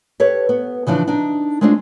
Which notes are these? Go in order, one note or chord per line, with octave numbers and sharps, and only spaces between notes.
G4 A4 B4 C#5
B3
C#3 E3 F3 D4
D4 D#4
G#3 A3 C4 D4 F4